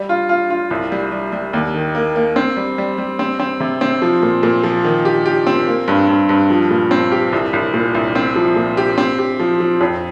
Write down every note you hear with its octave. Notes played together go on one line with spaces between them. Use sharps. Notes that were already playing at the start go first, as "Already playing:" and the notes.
Already playing: G3
F4
F4
F4
C2
G3
G3
G3
D#2
D#3
A#3
A#3
C4
G3
G3
G3
C4
C4
C3
C4
F3
A#2
A#2
F3
D#3
G4
G4
C4
A#3
G2
G2
G2
F3
A#2
C4
G4
C2
C2
A#2
C2
C4
F3
A#2
G4
C4
G4
F3
F3
F2